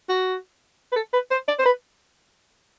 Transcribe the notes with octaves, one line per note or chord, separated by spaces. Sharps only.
F#4
B4
A4
B4
C5
D5
C5
B4